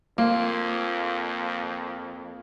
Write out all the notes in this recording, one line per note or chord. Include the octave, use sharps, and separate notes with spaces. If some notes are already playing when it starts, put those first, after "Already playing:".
F2 F3 A#3